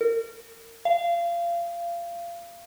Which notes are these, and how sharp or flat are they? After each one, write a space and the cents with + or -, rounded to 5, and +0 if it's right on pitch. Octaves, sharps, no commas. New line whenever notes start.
A#4 -30
F5 -25